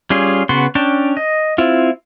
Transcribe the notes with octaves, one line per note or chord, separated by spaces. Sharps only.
G3 C#4 F4 G#4
C#3 B3 F#4 C6
C#4 D4 G5 A5
D#5
C4 E4 F4